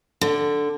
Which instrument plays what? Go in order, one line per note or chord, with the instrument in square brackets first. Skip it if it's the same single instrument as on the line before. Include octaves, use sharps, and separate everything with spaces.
[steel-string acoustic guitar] D3